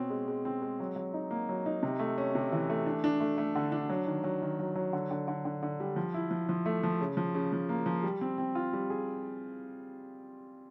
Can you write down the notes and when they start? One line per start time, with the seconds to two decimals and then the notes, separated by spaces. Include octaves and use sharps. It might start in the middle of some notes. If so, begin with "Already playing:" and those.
Already playing: B2 C4 C#4
0.10 G#3
0.28 G#3
0.45 C4
0.62 G#3
0.80 F#3
0.96 F#3
1.14 D#4
1.31 A#3
1.49 F#3
1.66 D#4
1.83 C3
1.99 A3
2.18 C#4
2.35 C3
2.52 E3
2.70 A3
2.86 D4
3.04 D4
3.20 A3
3.38 A3
3.55 D3
3.72 D4
3.89 F#3
4.07 D#3
4.24 F#3
4.42 D#3
4.59 F#3
4.75 F#3
4.93 D3
5.11 D3
5.28 D3
5.45 D3
5.63 D3
5.80 G3
5.96 F3
6.14 E4
6.31 F3
6.49 F3
6.66 A3
6.83 F3
7.01 C#3
7.17 F3
7.35 C#3
7.53 F3
7.69 A#3
7.86 F3
8.03 G3
8.21 C4
8.38 C4
8.55 F4
8.73 G3
8.90 G#4